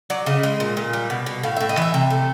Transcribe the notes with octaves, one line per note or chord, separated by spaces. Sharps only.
F#3 D5
C#3 D#5
G#3
A#2
A#2
G3
B2
B2
A2 F5
A2 E5
D#5
E3 E5
C3
A3